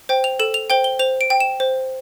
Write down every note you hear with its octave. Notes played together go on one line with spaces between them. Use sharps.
C5 G5
F7
A4 E7
F7
C5 G5 G7
G7
C5 F7
D7
G5
E7
C5